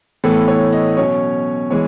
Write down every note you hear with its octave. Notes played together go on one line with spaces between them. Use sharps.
A2 E3 B3 A4
C#5
D#5
B2 F#3 C#4 C#5
E3 G#3 B3 C#5